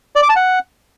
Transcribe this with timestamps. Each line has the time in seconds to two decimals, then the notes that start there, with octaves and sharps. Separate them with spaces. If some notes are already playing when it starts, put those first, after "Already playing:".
0.16 D5
0.22 D6
0.29 A5
0.36 F#5